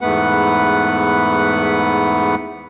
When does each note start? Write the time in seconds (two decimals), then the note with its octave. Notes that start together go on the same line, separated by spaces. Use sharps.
0.01 E2 G#2 A3 B3 B4 F#5